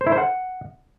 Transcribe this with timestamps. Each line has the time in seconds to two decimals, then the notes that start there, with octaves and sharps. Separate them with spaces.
0.01 C5
0.06 E4
0.12 C5
0.18 F#5